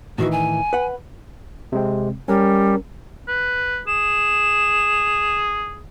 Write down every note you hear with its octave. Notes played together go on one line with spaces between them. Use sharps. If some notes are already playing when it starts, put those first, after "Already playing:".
A2 D#3 E3 F#4
G#5
B4 F#5
C3 G#3 C4
G3 C#4 A#4
B4
G#4 E7